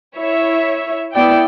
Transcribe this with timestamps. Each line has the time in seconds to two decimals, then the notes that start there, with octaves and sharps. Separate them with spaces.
0.17 E4 C#5 E5
1.13 B3 E4 D5 G5